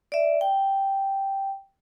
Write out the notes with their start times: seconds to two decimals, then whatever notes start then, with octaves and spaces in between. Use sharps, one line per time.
0.12 D5 E5
0.41 G5